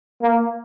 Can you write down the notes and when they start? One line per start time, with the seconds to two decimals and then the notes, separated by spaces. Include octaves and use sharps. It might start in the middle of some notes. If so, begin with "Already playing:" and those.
0.22 A#3